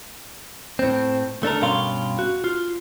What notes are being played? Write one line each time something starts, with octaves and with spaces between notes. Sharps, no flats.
A2 C4
A3 D4 A4 A#4
G2 B2 C#4 F5 C6
F#4
F4